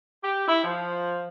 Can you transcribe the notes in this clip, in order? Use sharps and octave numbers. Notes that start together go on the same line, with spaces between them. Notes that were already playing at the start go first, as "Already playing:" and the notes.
G4
E4
F3